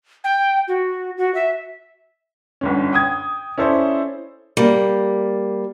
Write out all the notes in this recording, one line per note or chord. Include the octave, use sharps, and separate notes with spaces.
G5
F#4
F#4
E5
G1 D3 C#4
G5 D#6 G#6
C#4 E4 A4 C5 D5
G3 A#3